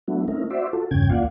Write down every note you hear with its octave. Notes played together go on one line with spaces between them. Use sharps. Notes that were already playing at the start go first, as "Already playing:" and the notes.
F#3 A3 B3 D4 E4 F#4
A3 C4 C#4 D#4 E4 A#4
F#4 C5 D5 E5
F4 F#4 A4
E2 G2 C#3 C#4 G5 G#6
D2 A#3 F4 D5 F5 F#5